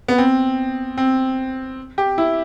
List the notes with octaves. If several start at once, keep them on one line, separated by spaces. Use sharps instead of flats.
B3
C4
C4
G4
E4